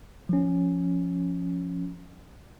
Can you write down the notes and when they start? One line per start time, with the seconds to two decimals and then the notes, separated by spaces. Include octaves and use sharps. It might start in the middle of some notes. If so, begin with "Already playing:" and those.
0.29 F3 C#4